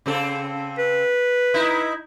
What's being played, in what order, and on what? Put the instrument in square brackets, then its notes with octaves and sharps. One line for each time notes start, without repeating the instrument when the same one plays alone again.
[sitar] C#3 C4 A4
[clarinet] B4
[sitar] D#4 E4